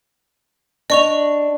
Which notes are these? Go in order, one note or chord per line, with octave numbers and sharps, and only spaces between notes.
D4 D#5 C#6 F7